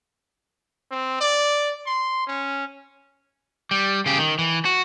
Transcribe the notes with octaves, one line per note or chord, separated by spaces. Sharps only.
C4
D5
C6
C#4
G3
C#3 G4
D#3
E3
F#4